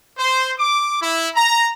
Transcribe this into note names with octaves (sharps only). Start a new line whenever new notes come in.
C5
D6
E4
A#5